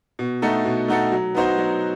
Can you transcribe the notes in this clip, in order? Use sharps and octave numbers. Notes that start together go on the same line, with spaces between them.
B2
A3 D#4 F#4 A4
B2
A3 D#4 F#4 A4
F#3
B3 D#4 F#4 C5
F#3